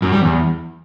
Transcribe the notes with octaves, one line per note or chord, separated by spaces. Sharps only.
F#2
G3
E2